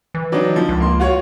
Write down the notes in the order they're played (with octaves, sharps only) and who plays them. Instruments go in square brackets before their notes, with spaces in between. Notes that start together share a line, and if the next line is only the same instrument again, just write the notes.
[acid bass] E3
[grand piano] F#3 D4 D#4
F3
[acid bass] C#2
[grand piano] A#3 C6
F4 F#4 C#5